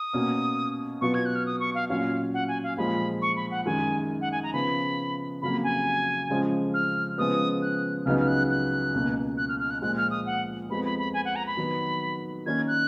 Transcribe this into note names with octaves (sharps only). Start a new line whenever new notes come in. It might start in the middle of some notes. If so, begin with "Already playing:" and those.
Already playing: D#6
B2 A#3 C#4 F#4
B2 F#3 B3 F4 C#6
G#6
F#6
F6
D#6
C#6
F5
A#2 F#3 C#4 F4 F5
F#5
G#5
F5
A#2 F3 G#3 B5
C#6
B5
F#5
F#2 D#3 G#3 G#5
F#5
G#5
A#5
C#3 F3 B3 B5
F2 C#3 F#3 A#3 B5
G#5
C#3 F3 G#3 C#4
F6
C#3 F3 G#3 B3 D#6
F#6
C#2 C#3 F#3 B3 D#4 F6
F6
F#6
F#6
C#2 B2 A#3
F#6
F6
F6
F#6
A#2 F3 G#3 F#6
F6
D#6
F#5
F2 F3 G#3 B3 B5
B5
B5
G#5
F#5
A#5
B5
D#3 F#3 B3
D#3 A#3 C#4 G#6
F#6